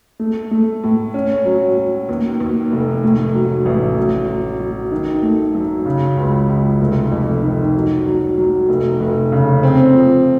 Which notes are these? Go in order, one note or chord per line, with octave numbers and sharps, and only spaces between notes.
A3
A3
A2
C#4
F#3
F#3
D#2
D#2
F1
A2
F#3
A1
F#3
F#3
F#3
D#3
A3
F#2
C#3
C#2
C#2
F1
F2
D#3
F#3
F#3
F#3
F1
F1
C#3
C4
F3